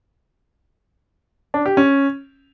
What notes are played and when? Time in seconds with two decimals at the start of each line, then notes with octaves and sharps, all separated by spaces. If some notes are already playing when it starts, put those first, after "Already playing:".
1.54 D4
1.66 G4
1.77 C#4